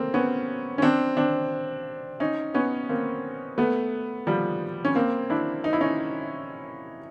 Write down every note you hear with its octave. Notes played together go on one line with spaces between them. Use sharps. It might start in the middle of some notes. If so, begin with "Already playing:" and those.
Already playing: A3 A#3 C4
B3 C#4
C#4
C4 D4
C4 D4
C#4 D#4
B3 C#4
A#3 C4
A3 B3
F3 G3
C#4
A#3 C4
D4 E4
D#4
E4
C#4 D#4